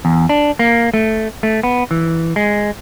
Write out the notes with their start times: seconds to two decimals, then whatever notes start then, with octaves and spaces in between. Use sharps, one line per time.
0.05 E2
0.29 D4
0.59 A#3
0.94 A3
1.43 A3
1.63 B3
1.91 E3
2.36 G#3